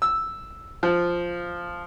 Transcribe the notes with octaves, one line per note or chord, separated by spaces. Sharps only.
E6
F3